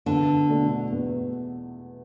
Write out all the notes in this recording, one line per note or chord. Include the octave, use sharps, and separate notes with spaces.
E2 D3
B2 A3 D4
E2